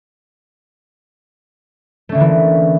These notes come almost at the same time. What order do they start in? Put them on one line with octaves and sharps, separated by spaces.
A3 C#4 D3 A#3 E3